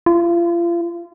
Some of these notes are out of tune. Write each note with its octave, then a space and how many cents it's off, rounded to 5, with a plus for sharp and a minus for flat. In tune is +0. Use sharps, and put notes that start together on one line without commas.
F4 -35